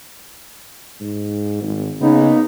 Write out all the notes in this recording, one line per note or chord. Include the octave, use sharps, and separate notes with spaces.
G#2
G#1
C#3 A#3 B3 D#4